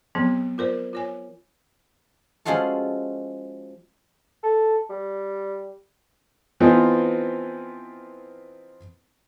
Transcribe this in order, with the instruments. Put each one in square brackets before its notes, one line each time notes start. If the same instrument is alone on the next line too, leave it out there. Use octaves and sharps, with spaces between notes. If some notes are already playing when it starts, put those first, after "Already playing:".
[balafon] F3 F#3 B3 C4 G#4
F4 A#4 C5 D5
F4 C#5 G#5
[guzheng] F3 G#3 C#4 F4 F#4 A4
[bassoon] A4
G3
[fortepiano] E3 F3 B3 C4 D#4 F4